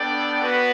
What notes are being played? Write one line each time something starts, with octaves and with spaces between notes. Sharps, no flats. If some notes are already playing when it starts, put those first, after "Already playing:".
Already playing: B3 D4 A4 D5 G5
B3 F#4 B4